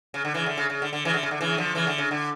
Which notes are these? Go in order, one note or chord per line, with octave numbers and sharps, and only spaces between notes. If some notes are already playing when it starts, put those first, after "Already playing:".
C#3
D3
C#3 E3
D3
C#3
C#3
D3
D3
C#3 E3
D3
C#3
D3
C#3 E3
D3 F3
C#3 E3
D3
C#3
D3